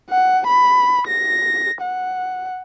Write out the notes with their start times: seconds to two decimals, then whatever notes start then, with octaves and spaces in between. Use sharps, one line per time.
0.10 F#5
0.47 B5
1.08 A#6
1.82 F#5